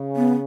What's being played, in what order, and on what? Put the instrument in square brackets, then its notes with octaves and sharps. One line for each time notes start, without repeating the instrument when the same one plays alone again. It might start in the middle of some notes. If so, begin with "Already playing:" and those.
Already playing: [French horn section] C#3
[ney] B3